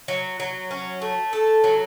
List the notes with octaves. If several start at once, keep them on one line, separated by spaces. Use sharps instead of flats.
F#3
F#3
C#4
A3
A4
F#3